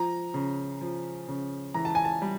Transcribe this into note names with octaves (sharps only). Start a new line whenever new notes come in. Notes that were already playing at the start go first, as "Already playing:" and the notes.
Already playing: F3 A#5
C#3
F3
C#3
E3 A#5
A5
G#5
A5
G3